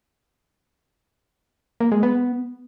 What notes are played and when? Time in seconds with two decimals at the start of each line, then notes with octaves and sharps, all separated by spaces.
1.80 A#3
1.92 G#3
2.03 B3